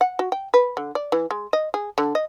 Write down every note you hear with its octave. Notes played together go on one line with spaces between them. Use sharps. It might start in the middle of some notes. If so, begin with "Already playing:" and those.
F#5
F#4
G5
B4
D3
D5
E3
G#3
D#5
G#4
D3
D#5